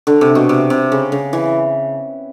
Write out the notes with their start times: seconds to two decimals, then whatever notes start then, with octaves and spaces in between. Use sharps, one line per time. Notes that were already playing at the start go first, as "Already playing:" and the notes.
0.07 D3
0.21 C3
0.35 B2
0.49 C3
0.70 C3
0.92 C#3
1.12 C#3
1.33 E3